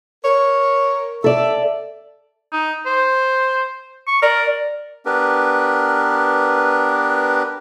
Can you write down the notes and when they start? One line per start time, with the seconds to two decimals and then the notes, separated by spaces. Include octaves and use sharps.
0.25 A#4 C#5
1.24 A4 D5 E5
2.53 D#4
2.86 C5
4.07 C#6
4.22 A#4 D5
5.06 B3 D4 G4 A#4 B4